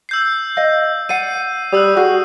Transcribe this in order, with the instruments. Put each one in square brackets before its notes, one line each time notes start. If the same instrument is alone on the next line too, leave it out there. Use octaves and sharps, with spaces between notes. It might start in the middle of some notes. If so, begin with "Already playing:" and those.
[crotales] E6 G6 C7
[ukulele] D5 D#5 F5
[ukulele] D5 F#5 [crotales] C7 D#7
[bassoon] G3 [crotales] D#6 E6 F#6
[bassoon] F#4 [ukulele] G#4